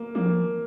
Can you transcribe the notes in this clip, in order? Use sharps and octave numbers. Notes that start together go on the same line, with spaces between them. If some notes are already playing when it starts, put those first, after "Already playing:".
Already playing: A#3
F3 A#3